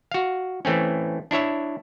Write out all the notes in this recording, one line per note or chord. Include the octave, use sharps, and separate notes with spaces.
F#4 F5
E3 A3 C4 C#4
D4 E4 C#5 E5